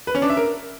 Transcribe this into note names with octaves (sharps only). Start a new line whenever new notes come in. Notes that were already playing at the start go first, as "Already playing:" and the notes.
B4
C#4
D4
E5
A#4